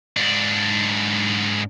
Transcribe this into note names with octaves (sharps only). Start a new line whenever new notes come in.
G#2 D4